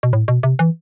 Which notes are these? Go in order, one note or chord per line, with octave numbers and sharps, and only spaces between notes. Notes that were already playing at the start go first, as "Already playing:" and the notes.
B2
A2
B2
C3
E3